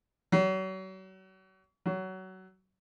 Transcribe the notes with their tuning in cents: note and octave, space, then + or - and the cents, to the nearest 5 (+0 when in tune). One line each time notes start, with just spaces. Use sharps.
F#3 +40
F#3 +25